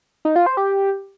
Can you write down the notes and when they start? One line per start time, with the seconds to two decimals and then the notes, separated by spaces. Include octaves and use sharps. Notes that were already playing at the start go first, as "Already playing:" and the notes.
0.25 D#4
0.36 F4
0.46 C5
0.57 G4